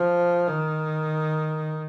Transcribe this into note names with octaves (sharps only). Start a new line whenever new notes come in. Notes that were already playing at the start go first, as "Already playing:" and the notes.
Already playing: F3
D#3